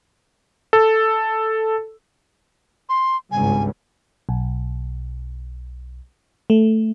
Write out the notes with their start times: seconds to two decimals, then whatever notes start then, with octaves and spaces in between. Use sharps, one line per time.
0.73 A4
2.89 C6
3.32 G#1 C#2 G2 G#5
4.29 B1
6.50 A3